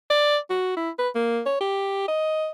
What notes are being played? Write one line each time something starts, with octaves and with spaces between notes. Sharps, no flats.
D5
F#4
E4
B4
A#3
C#5
G4
D#5